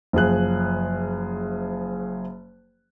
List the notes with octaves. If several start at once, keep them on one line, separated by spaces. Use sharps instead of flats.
F#1 F3 G#4 F#6